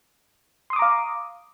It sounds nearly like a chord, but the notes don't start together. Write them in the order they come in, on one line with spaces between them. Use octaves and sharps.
C6 D#6 D6 A#5 F5